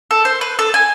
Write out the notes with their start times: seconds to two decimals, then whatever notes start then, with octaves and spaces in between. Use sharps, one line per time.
0.11 A4
0.25 C5
0.41 B4
0.59 A4
0.74 G#5